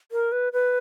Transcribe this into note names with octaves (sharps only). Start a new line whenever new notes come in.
A#4
B4
B4